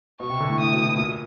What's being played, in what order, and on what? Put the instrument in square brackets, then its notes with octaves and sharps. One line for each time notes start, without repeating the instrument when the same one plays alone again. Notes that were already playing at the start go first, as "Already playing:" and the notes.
[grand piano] B2 [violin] C#6
[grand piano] C3
D3
A2
[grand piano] A2 [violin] D#6
[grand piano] B2
A2
A#2